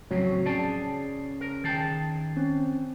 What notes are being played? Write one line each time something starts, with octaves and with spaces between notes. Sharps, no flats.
F2 A2 C#3 F#3 C4 C#5
C#3 G#4 D5 G5 A5 C7
A#4
D#3 G#4 G5 A5 G6 A6
C4 C#4